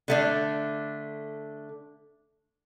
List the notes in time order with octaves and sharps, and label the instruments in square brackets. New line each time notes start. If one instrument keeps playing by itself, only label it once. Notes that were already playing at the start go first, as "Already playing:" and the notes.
[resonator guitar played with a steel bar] D3 A3 D4